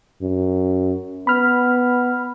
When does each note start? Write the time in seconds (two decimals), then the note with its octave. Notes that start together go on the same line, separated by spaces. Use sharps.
0.22 F#2
1.27 B3 B5 F6